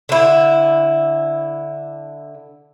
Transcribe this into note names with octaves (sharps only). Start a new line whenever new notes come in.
D3 E4